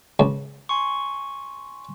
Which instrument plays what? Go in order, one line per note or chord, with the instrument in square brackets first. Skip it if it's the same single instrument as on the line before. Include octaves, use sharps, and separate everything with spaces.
[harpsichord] C#2
[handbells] G#5 C6 C#6